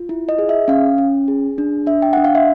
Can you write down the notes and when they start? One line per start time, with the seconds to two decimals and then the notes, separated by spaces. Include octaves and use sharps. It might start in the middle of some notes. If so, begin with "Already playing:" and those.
Already playing: F4
0.09 E4
0.29 D#5
0.39 G#4
0.49 E5
0.68 C#4 F5
0.98 C#4
1.28 G#4
1.58 D4
1.87 D4 E5
2.02 G5
2.13 D4 F#5
2.24 F5
2.35 E5